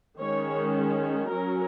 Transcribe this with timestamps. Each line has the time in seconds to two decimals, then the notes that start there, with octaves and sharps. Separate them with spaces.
0.20 D#3 G#3 C#4 C#5
1.31 F#3 C#4 A#4